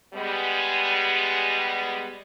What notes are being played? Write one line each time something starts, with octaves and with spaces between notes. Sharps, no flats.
G3 G#3 B3